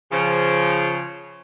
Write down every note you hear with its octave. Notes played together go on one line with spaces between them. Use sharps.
C#3 F3